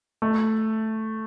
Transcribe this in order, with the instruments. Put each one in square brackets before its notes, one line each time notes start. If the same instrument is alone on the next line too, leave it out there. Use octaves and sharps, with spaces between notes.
[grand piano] A3